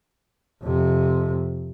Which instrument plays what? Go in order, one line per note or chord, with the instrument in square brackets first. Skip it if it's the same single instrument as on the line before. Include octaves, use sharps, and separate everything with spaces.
[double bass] F2 C3